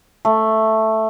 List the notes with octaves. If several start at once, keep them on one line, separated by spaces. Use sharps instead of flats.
A3